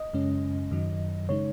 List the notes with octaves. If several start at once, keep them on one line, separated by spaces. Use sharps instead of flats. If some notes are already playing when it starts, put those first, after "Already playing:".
Already playing: D#5
F#2 C#3 G#3 C#4
F#2 D#3 F#3
C#3 G#3 D#4 C#5